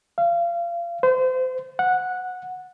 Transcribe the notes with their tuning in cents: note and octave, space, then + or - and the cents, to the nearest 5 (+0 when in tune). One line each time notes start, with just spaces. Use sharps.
F5 -30
C5 -30
F#5 -10